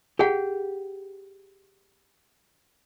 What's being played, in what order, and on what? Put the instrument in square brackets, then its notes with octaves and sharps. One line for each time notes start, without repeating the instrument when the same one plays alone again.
[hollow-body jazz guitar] G4 G5 [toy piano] G#4 F#5